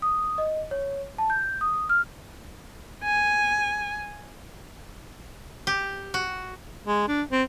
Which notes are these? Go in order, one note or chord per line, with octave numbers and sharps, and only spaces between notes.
D#6
D#5
C#5
A5
G6
D#6
F6
G#5
G4
F#4
G#3
D4
C4